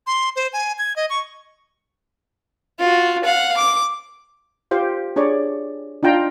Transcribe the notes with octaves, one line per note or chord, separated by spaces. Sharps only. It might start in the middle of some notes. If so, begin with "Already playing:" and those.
C6
C5
G#5
G#6
D#5
C#6
F4 F#4
F5 F#5
D6
F4 G4 C5 F5
D4 G#4 C#5 D5
D4 D#4 F4 G5 A#5 C6